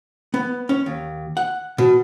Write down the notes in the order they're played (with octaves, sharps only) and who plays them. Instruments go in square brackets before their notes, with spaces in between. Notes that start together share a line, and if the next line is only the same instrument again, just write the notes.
[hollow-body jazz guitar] B3
C#4
D#2
F#5
B2